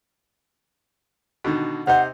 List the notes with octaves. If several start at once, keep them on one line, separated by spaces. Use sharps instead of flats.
B2 D3 D#3
C3 D#4 C5 F#5